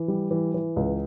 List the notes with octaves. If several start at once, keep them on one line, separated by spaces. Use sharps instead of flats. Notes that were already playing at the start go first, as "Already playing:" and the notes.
Already playing: E3
G3
E3
E3
C#2